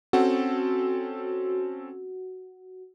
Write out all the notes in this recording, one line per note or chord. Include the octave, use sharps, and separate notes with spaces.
C4 C#4 F#4 A4